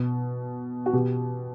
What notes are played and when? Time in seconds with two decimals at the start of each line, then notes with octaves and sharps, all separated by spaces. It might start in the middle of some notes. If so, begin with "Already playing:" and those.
Already playing: B2
0.86 F#4
0.93 B2 G4